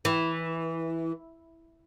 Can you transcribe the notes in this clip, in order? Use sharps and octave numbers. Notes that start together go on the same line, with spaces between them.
E3